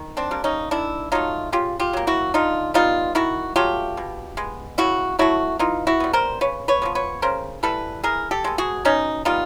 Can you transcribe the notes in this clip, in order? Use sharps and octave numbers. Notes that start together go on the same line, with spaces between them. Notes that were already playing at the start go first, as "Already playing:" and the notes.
Already playing: D#3
C4 D4
G3 A#3
C#4 D#4
D#3 D4 E4
F#3 A3 D#4 F4
C#3 F4 G4
F4 G4
F#3 A#3
E4 F#4
D3 D#4 F4
G3 B3 D#4 F4
D#3 E4 F#4
F#3 A3 F4 G4
B2
G#3 B3
C#3 E4 F#4
F#3 A3 E4 F#4
E3 D#4 F4
E4 F#4
G3 B3
A#4 C5
C#3 B4 C#5
B4 C#5
F3 G#3 B3
B4 C#5
C#3 A#4 C5
E3 G3 A4 B4
E3 G#4 A#4
G4 A4
G#3 B3
F#4 G#4
B2 C#4 D#4
G3 B3 D#4 F4